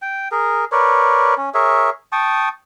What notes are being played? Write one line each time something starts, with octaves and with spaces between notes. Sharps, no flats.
G5
G#4 A#4
A#4 B4 C#5 D5
C#4
G#4 A#4 C#5 E5
G5 A5 C#6 D#6